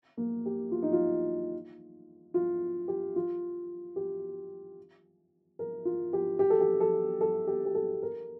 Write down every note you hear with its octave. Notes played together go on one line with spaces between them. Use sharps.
A#3
G4
F4
D#4
F4
F4
G4
F4
G4
A#4
F4
G4
G4
A4
G4
A4
A4
G4
G4
A4
A#4